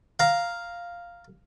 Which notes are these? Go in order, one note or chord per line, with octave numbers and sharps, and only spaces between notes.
F5 A#5